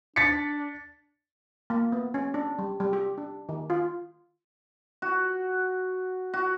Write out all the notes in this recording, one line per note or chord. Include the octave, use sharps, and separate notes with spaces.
D4 A6 B6 C#7
A#3
B3
C#4
D4
G3
G3
G4
D4
D#3
F4
F#4
F#4